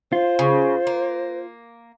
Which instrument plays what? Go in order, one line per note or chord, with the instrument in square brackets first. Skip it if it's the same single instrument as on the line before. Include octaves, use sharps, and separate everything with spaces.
[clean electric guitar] F4 [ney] C5
[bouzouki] C#3
A#3